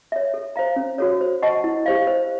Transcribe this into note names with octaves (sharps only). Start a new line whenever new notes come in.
C#5 E5
A4
C5 F5 A#5
C#4
F#4 A4 C#5
C5
D#5 F#5 A5 C#6
E4
G4 C5 F5
C5